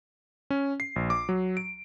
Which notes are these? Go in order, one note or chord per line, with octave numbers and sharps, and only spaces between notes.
C#4
C7
A#1
D6
F#3
D7